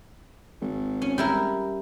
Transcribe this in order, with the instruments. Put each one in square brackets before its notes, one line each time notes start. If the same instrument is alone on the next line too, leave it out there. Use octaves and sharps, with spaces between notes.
[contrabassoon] G#1
[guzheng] C#4
G3 E4 A#4